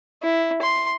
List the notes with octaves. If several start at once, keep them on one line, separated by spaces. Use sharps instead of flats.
E4
C6